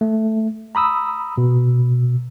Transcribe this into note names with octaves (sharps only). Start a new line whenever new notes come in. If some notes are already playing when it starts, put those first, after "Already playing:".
A3
A#5 B5 D#6 E6
B2